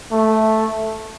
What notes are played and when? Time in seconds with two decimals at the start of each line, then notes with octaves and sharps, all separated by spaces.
0.12 A3